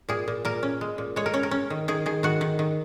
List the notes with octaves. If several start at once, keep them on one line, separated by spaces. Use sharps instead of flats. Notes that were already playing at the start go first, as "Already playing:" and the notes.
A#2 G#4
A#2
A#2 A#4
C#4
G#3
A#2
G#3 C#5
A#4
C#4 C#5
A#4
C#4
D#3
D#3 G#4
D#3 G#4
D#3 F#4
D#3
D#3